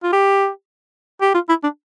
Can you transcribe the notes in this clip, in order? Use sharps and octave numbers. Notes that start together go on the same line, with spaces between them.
F4
G4
G4
F4
E4
D4